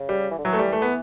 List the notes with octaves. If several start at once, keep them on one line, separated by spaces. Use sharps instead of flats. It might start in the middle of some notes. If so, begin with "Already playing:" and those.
Already playing: C#3
G3
E3
D3
E3 F#3
A3
G3
A3
B3